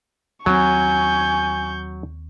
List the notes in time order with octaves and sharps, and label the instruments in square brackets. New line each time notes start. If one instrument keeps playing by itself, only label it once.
[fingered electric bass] D#2 C4 [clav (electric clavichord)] F#3 [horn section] G#5 [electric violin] C#6 G6